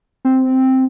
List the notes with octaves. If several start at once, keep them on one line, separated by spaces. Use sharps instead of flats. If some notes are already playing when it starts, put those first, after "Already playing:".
C4